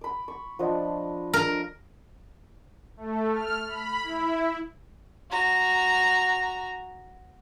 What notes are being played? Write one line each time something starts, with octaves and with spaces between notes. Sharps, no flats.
B5 D6
C#6
F3 D4 D#5
A#4
A3
F6
B5
E4
F#4 A#5